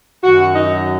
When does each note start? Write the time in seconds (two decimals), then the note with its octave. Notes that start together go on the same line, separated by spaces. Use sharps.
0.24 F#2 D#3 F#3 F#4
0.55 D#4